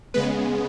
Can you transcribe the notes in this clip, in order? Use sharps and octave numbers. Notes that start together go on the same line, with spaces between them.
C#3 G#3 B3 B4